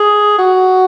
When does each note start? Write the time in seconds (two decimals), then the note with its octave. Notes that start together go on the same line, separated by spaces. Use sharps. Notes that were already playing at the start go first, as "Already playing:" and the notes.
Already playing: G#4
0.39 F#4